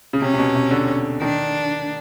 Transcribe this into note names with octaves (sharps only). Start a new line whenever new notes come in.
C#3
C3 C#4
C3
B2
C3
D3
D#3 D4